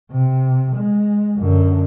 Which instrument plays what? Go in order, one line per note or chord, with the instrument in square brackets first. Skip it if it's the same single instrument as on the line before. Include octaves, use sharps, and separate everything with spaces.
[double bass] C3
G#3
F#2 D3